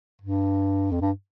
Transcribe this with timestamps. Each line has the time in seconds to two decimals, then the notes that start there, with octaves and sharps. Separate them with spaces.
0.21 G2
0.91 F2
1.01 G2